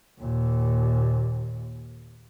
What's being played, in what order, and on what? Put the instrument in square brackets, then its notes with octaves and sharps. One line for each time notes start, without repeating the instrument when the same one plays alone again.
[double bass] D#2 A#2